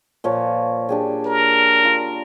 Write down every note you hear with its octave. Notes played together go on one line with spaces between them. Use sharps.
A#2 F3 C#5
D4 G4 G#4
A#4
F4